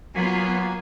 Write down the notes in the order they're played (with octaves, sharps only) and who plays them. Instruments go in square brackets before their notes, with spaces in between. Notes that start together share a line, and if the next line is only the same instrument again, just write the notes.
[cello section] F#3 B3 F4 [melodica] A#3 F#4 G#5